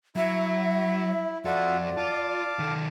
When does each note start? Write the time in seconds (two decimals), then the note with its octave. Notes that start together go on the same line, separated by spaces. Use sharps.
0.16 F#3 E4 E5
1.45 F2 F4 F#4 A4 D5 E5
1.97 F4 F5 A5 D6
2.59 D#3 A4